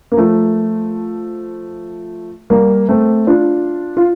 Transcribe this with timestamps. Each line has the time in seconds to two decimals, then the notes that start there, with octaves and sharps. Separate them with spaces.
0.12 A#3
0.17 F3 A3
2.50 G3 A#3
2.89 A3 C4
3.27 D4 F4
3.97 F4